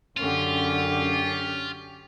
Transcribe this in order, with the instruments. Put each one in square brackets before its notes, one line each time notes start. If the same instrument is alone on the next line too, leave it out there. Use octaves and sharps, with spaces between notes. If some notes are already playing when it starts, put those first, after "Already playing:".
[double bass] F#2 D3 [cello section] C#4 G4 [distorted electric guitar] F4